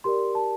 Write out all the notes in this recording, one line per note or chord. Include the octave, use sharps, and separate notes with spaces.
G4 A#4 D5 C6
A5